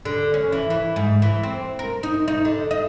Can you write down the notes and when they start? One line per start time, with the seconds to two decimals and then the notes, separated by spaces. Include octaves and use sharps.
0.05 D3
0.34 C#4
0.52 E3
0.70 E3
0.96 G#2
1.22 E3
1.43 C4
1.79 A#4
2.03 D#4
2.28 D#4
2.45 D3
2.71 D#5